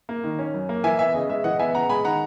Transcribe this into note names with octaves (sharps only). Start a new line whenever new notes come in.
A#3
D#3
C#4
F#2
A#3
E3 E5 G#5
B3 E5 G#5
C#3 D#5
G#3 E5
E3 D#5 F#5
B3 E5 G#5
C#3 F#5 A#5
G#3 G#5 B5
D#3 F#5 A#5